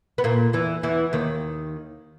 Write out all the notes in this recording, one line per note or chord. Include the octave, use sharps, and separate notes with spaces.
B3
A#2 A#3
E2 E3
E2 E3
D#2 D#3